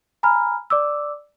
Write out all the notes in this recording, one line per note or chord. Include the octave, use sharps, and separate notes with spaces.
G#5 A#5 B5 F6
D5 D6 E6